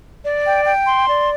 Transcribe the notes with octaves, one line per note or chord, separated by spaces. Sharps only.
D5
G5
G5
C6
D5